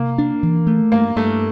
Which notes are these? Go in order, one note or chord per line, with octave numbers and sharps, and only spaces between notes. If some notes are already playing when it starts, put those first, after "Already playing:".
Already playing: C3 A#3
D4
E3
A3
G2 A#3
G2 A3